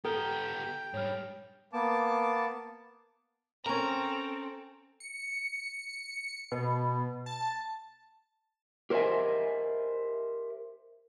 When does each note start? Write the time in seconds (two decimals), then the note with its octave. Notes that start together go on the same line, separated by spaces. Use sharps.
0.05 B3 G4 A4 G5 A#5 F6 G7
0.94 G#2 G3 C#5 F6
1.73 A#3 B3 A5 D6
3.66 C4 C#4 A4 A#4 A#5
5.00 C#7
6.52 B2
7.26 A5
8.90 G4 A#4 C5 D#5 E5 G#5